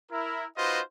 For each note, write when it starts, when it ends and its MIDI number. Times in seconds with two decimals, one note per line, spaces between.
0.11 0.45 64
0.11 0.45 70
0.57 0.80 63
0.57 0.80 65
0.57 0.80 66
0.57 0.80 71
0.57 0.80 72
0.57 0.80 75